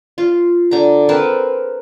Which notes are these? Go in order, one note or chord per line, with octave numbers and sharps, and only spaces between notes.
F4
D3 A#5
C4 A#4 B4 A5